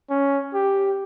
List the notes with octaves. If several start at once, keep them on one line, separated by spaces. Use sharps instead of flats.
C#4
G4